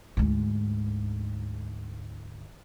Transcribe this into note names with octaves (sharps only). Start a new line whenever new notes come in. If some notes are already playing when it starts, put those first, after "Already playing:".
D2 G#2